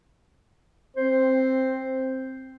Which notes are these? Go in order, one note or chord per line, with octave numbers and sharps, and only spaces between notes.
C4 C5